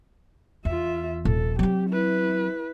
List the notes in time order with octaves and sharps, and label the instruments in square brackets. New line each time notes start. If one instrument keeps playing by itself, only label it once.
[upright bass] E2 [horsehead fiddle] F4 E5
[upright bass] D#1 A#1 [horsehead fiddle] A4
[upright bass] F#3 C4 [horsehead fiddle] G4
[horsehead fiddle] E4 B4